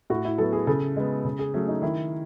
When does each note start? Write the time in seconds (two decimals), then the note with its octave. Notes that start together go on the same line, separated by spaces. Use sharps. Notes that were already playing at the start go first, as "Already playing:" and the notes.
0.10 A2 F#4
0.25 E4
0.38 F#3 B3 A4
0.53 G#4
0.67 C#3 A4
0.96 G#3 B3
1.25 C#3
1.39 G#4
1.54 F#3 A3 C#4
1.68 D#4
1.82 D#3 E4